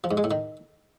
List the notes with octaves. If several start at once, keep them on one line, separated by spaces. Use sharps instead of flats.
F3
G#2
G#3
A2
D#3